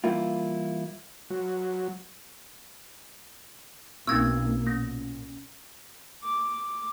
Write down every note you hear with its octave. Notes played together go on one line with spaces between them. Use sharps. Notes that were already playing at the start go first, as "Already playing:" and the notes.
E3 G3 A#3 E4 F4
F#3
B1 A#3 C4 C#4 D#4 E6 G#6
A#2 C#4 A#6
D6